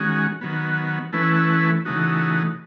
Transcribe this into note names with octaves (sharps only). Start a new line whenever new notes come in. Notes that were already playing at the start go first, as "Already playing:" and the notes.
Already playing: D#3 G#3 C#4 F#4
D#3 F#3 B3
E3 A3 C#4 E4 B4
C#3 E3 A3 D#4 F#4